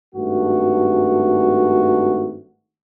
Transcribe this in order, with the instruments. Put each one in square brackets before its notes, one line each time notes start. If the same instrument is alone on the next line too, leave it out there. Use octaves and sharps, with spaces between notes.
[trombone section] G#1 G2 A3 F#4